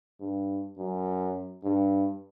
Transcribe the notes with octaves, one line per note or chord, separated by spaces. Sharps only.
G2
F#2
G2